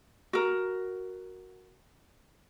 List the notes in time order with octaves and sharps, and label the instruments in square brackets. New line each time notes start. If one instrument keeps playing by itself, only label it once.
[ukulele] F#4 A#4